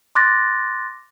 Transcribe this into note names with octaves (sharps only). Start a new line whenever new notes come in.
C6 D6 F#6 A6 A#6